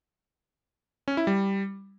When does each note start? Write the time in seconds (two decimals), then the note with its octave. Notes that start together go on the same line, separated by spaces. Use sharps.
1.08 C#4
1.17 E4
1.27 G3